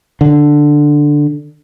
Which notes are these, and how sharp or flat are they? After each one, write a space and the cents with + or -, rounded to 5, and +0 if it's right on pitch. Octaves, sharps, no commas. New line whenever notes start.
D3 +5